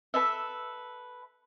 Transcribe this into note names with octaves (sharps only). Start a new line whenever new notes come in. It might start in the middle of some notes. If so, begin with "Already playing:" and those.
A4 B4 E5